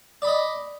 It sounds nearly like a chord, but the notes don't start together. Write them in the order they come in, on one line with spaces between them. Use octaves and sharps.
D5 B5 D#5